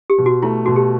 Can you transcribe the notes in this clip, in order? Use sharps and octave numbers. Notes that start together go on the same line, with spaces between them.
G4
B2
F#4
A3 E4
B2 F#4
G4